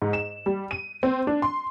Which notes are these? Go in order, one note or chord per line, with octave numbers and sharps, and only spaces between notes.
G#2
E7
G3
D#7
C4
D4
C6